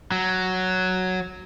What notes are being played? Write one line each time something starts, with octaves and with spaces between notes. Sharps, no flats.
F#3